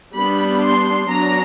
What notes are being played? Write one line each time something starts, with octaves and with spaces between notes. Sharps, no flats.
G3 B3 D4 B5
C6
F#3 B3 D4 A#5